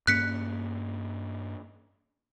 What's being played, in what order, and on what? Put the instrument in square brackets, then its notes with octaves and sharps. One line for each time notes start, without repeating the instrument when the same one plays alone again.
[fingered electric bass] G2 A#3 C#4 [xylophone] F#6 B6 C#7